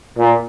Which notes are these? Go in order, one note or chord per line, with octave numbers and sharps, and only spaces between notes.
A#2